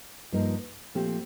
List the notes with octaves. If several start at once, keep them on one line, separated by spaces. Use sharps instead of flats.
G2 F3 A#3 D#4 A#4
A#2 F3 A3 C4 G4